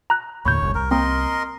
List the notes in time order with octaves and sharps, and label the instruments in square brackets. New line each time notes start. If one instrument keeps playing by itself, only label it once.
[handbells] A#5 F#6
[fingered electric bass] D#2 A2 D3 [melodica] C#5 [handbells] B5 C#6 G6
[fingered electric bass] F1 C2
[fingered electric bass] C2 [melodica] A#4
[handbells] A#3 C4 [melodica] A#4 D#5 C6